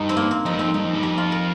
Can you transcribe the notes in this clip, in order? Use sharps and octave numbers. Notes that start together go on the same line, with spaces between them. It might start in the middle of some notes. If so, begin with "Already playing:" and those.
Already playing: G2 D#4
C4
A#3
C4
F2 D#4
G2
F2 C4
G2 D#4
F2
G2
F2 G4
F4
A#4